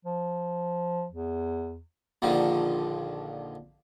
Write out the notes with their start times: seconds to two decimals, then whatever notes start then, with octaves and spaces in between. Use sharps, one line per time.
0.05 F3
1.12 E2
2.22 A#1 D3 D#3 F3